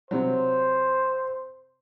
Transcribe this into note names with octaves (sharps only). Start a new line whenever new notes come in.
C3 F#3 C5